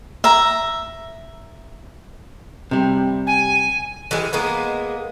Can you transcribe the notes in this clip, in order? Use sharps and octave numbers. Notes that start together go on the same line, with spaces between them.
E5 A#5
C3 G3
G#5
E3 G3 G#3
G#3 A#3 B3